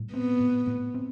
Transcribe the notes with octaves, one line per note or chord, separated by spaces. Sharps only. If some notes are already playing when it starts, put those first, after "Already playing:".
Already playing: A2 G3
B3 C4
A2
A2
C4